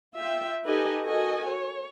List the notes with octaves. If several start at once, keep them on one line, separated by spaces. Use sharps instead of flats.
F4 E5 G5
D#4 G4 A4 B4 D#5 G#5
F#4 A4 A#4 D#5 G#5
C#5